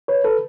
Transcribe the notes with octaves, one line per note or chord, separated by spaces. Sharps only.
B4 C#5
A4 B4